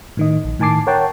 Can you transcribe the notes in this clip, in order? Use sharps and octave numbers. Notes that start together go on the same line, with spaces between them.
A2 D#3 D#5
A#1
A2 D#3 G#5 A5 D6 C7
A#4 C#5 F#5 G5 A5